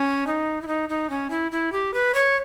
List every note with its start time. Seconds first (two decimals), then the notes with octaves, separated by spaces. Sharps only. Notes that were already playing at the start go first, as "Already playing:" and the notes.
Already playing: C#4
0.27 D#4
0.62 E4
0.67 D#4
0.89 D#4
1.10 C#4
1.30 E4
1.51 E4
1.72 G4
1.94 B4
2.14 C#5